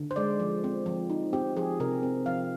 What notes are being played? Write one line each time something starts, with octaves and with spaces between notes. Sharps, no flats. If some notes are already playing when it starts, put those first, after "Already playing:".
Already playing: D3
C5
G#3 D5
F3
C4
F3
D#4
C4 G4
F3 G#4
C3 A#4
C4
F3 F5